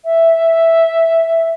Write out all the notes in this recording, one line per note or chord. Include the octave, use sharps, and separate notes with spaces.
E5